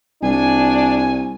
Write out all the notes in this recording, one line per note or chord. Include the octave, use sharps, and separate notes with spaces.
C2 D4 G#5